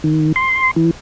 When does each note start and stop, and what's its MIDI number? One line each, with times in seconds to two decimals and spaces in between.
0.04 0.32 51
0.36 0.71 84
0.76 0.91 52